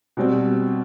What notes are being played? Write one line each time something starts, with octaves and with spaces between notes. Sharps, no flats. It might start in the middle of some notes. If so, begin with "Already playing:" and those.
B2 G3 C4